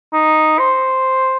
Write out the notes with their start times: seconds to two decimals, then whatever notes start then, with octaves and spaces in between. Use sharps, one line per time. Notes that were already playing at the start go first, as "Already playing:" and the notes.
0.13 D#4
0.59 C5